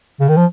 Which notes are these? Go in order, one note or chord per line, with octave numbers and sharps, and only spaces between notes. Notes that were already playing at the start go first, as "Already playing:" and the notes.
C#3
D#3
F3